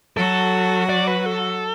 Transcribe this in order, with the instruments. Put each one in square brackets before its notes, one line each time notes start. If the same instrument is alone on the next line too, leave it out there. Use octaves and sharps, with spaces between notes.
[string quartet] F#3 F#4 [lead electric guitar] A4
[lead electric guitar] D5
B4
A4